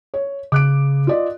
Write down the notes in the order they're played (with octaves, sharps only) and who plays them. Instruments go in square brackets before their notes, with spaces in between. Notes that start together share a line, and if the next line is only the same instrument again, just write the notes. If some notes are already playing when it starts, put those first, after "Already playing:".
[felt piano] C#5
[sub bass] C#3 [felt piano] D6 F#6 D7
[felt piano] F4 D5 D#5